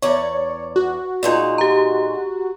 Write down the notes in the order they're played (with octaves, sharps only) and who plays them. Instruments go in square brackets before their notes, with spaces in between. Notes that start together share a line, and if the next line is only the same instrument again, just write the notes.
[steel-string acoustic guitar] E2 D5 [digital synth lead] C#5
[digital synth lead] F#4
[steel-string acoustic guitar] A#2 G#3 D#4 [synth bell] F4 D5
[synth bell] G4 A#5